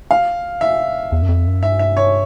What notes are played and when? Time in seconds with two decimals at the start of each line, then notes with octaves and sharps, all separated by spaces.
0.11 F5
0.61 E5
1.12 E2
1.22 F#2
1.29 F2
1.46 F#2
1.63 G2 E5
1.79 E5
1.97 C#5